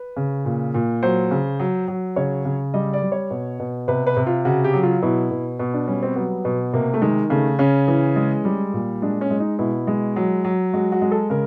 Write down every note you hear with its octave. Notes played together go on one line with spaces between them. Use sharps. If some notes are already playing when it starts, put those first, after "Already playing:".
Already playing: B4
C#3
A#2
A#2
F#3 C5
C#3
F#3
F#3
C#3 C#5
C#3
G3 D#5
D5
G3
C#5
B2
B2
C3 B4
B4
C3
F4
C#3 F#4
G4
F#3
F4
B2 E4
B2
B2
D4
G3 C#4
C4
F#3 B3
B2
C3 A#3
A3
D#3 G#3
C#3 A3
C#3 C#4
E3
G#3
G3
A#2
G#3 D4
C#4
G#3
D#4
B2 E4
G#3
F#3
F#3
G#3 F#4
F#4
G#3
A4
C#3 A#4